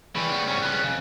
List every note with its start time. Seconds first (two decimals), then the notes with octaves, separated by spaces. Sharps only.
0.15 C#3 E3 G3 C#6
0.31 B3
0.48 G#2 C#4 C#6
0.62 B3 C#4 F#6
0.84 F2 C#3